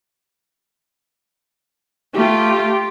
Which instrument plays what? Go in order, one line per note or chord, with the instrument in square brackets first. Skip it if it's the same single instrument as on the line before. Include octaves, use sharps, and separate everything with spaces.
[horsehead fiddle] A3 [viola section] F4 G4